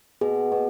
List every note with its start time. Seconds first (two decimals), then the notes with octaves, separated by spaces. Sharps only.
0.21 B2 G#4
0.52 B2